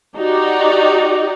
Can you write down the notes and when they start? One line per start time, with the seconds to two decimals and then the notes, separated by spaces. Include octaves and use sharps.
0.16 D#4 F#4 G4 D5